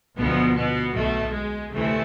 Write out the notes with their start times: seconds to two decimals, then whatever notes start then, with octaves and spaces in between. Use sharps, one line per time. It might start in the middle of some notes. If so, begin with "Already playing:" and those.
0.17 D2 B2 D3 F3 B3
0.56 B2 B3
0.95 B1 B2 A3
1.33 G#3
1.71 D2 C3 E3 A3